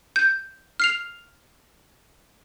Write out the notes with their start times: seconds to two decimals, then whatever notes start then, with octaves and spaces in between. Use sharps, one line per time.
0.16 G6
0.80 F6 C7 F7